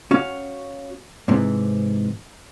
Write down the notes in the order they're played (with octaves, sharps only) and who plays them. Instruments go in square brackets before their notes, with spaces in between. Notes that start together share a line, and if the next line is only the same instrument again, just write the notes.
[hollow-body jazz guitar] C#4 F#4 F5
G#2 C3 E3